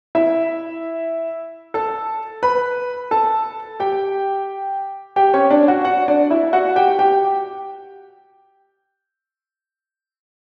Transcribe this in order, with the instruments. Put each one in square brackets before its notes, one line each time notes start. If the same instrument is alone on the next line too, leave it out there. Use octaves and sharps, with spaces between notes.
[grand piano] E4 E5
A4 A5
B4 B5
A4 A5
G4 G5
G4 G5
C#4 C#5
D4 D5
F#4 F#5
F#4 F#5
D4 D5
E4 E5
F#4 F#5
G4 G5
G4 G5